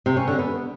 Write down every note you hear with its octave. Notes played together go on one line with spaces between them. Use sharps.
C3
C#4
D3
B3